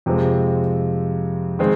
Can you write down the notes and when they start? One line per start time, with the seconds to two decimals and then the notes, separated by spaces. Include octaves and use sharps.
0.06 F2 C3 F3 G#3 C4
1.59 D#3 G#3 C4